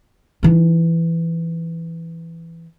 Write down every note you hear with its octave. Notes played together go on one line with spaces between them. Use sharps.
E3 D#4